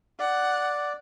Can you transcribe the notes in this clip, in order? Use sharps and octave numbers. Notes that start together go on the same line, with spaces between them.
D5 F#5